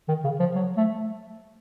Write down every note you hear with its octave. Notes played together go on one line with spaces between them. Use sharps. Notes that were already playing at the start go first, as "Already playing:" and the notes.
D#3
C#3
F3
F#3
A3